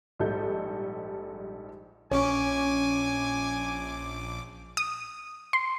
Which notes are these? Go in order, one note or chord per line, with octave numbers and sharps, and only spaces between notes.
A#1 G#2 G3 D#4 A4 G6
A#1 C#4 C#5 G#5 D6
D#6
C6